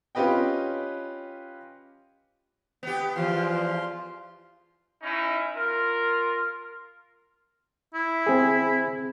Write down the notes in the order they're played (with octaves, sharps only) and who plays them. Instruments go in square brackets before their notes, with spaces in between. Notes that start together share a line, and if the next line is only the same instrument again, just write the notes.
[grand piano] C#4 F4 G4 B4 D#5 G5
[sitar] B3 G4
[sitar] E2 F3 [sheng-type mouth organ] F4 C6
[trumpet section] C#4 D#4 E4
F4 A#4
[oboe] E4
[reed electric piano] C4 G#4